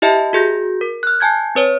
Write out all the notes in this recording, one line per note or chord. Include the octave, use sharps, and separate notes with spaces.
E4 G4 D#5 E5 A5
F#4 G#4 G6 A#6
A#4
F6 F#6
G#5 A5 G6 G#6
C4 B4 C#5